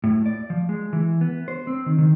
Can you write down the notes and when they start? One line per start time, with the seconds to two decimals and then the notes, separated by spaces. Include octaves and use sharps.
0.04 A2
0.26 D5
0.50 F3
0.69 G#3
0.93 E3
1.21 B3
1.48 C5
1.67 C4
1.86 D#3
1.98 D#3